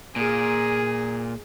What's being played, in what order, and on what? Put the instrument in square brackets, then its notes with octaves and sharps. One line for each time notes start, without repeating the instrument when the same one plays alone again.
[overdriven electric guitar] A#2 [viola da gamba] G#4